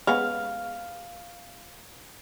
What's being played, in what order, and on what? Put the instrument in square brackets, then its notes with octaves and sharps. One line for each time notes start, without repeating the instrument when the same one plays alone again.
[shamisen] G#3 B3 C#4 [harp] F5